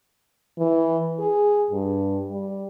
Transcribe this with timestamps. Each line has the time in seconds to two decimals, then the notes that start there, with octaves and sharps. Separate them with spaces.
0.58 E3
1.19 G#4
1.71 G2
2.31 G3